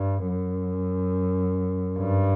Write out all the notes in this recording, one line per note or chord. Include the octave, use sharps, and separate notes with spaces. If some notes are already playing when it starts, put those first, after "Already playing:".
Already playing: G2
F#2
G2